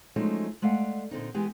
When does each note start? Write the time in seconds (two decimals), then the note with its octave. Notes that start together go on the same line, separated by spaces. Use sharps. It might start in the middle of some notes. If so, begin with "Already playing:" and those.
0.16 F3 F#3 G#3 A3 C#4 D#4
0.62 G#3 A3 D5 F5 F#5
1.11 A#2 D3 C4 D#4
1.34 E3 G#3 B3 G4 G#4